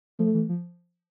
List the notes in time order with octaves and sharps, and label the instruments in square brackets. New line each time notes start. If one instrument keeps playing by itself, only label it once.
[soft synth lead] F3 [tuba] A3
[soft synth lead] E3
F3